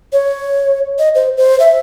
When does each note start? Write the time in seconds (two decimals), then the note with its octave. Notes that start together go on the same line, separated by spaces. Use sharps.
0.13 C#5
0.99 D#5
1.15 C5
1.37 C5
1.60 E5